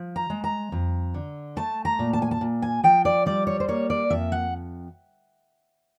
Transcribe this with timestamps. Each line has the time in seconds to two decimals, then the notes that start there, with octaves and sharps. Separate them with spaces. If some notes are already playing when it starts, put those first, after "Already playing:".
Already playing: F3
0.16 A#5
0.30 G#3
0.44 A#5
0.72 F2
1.14 D3
1.57 A3 A5
1.85 A#5
1.99 A#2
2.13 A5
2.22 G#5
2.31 A5
2.41 A#2
2.62 G#5
2.83 F3 G5
3.05 D5
3.26 G3 D5
3.47 C#5
3.60 C5
3.68 A#3 C#5
3.90 D5
4.10 F2 E5
4.32 F#5